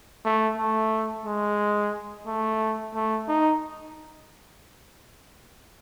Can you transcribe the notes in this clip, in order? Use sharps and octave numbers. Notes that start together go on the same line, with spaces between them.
A3
A3
G#3
A3
A3
D#4